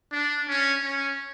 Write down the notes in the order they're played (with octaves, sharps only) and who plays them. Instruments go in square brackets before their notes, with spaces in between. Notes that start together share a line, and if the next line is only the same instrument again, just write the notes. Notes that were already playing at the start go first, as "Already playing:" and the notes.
[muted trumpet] D4
C#4
C#4